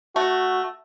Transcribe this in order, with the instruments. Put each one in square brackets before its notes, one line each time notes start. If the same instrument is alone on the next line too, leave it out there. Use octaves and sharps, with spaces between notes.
[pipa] A3 [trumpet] F#4